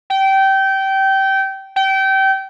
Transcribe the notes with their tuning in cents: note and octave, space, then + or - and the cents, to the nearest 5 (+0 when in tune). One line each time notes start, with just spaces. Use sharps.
G5 -20
G5 -25